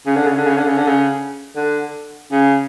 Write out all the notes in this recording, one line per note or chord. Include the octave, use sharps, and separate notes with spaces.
C#3
D3
C#3
D3
C#3
D3
C#3
D3
C#3
D3
C#3